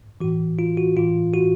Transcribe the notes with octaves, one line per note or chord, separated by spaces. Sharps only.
A2 E3 F#4
F4
F#4
A2 E3 F4
F#4